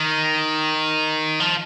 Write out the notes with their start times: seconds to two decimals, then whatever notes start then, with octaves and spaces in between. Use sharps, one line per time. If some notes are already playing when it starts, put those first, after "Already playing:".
Already playing: D#3
1.40 F3